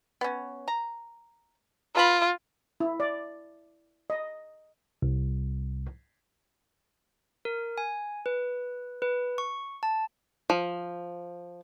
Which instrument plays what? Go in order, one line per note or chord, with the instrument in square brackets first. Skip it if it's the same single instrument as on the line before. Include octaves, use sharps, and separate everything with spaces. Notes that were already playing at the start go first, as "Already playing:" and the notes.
[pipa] B3 C#4
A#5
[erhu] F4 [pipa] B4 A5 B5
[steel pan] E4
D5
D#5
[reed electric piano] C2
[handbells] A#4
G#5
B4
B4
C#6
A5
[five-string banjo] F3